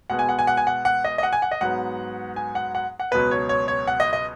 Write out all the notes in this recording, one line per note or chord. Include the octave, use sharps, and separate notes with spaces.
B2 G#3 B3 F#5
G#5
F#5
G#5
F#5
G#5
F#5
F#5
D#5
D#5
F#5
G#5
F#5
D#5
G#2 F#3 B3 F#5
G#5
F#5
F#5
F#5
C#2 B2 F#3 B3 B4
C#5
C#5
C#5
F#5
D#5
D#5